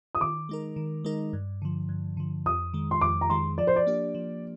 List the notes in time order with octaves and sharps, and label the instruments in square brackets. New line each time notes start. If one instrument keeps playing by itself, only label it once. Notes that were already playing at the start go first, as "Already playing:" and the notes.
[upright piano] D#6
[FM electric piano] D#3 [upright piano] D6
[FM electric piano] G#3 D#4 A#4
D#3
G#3 D#4 A#4
G2
D3 F3
G2
D3 F3
[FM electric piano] F2 [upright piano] D#6
[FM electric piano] D#3 G#3
[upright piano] C6
[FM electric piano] F2 [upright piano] D6
[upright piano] A#5
[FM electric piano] D#3 G#3 [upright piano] C6
[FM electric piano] F3 [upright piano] D5
[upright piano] C5
D5
[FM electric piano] A#3 D4 G4
F3